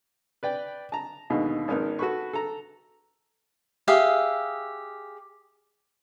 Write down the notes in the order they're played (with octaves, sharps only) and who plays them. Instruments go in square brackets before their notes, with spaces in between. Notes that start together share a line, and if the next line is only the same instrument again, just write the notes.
[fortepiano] B4 D5 G5
A5 A#5
D#2 G#2 B2 D3
G#1 G#2 C#3 B3 D#4 A#4
F#4 A4 B4 B5 C#6
A4 A#5
[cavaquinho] G4 G#4 E5 F5